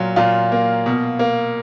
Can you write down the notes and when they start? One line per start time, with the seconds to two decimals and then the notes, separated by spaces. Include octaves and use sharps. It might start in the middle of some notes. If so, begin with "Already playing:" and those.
Already playing: A#2 F#3 F4
0.16 A#2 F4
0.52 A#3
0.86 B2
1.19 A#3